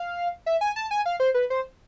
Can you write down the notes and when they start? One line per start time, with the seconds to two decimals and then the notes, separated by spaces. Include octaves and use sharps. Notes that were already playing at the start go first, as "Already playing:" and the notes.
Already playing: F5
0.46 E5
0.61 G#5
0.76 A5
0.91 G#5
1.06 F5
1.20 C5
1.34 B4
1.50 C5